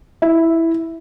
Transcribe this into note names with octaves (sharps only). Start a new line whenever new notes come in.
E4